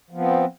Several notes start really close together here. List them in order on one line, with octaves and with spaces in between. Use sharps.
F3 B3 C4